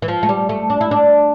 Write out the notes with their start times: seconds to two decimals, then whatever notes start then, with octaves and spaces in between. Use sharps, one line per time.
0.02 E3
0.08 F3
0.23 A3
0.29 G3
0.49 A3
0.70 D4
0.81 E4
0.91 D4